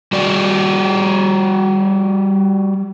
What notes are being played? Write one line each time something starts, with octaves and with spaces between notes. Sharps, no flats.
G3 F#4 D5